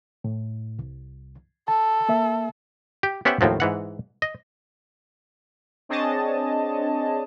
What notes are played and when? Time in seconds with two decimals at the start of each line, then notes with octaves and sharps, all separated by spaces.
0.24 A2
0.79 C2
1.68 A4 A5
2.09 A#3 E5
3.03 G4
3.25 B3 C#4 G4 C5 E5 F#5
3.41 D#2 A2 F3 F#3
3.60 G#2 E3 F#5
4.22 D#5
5.89 C4 D4 G#4 C#5 D#5 A5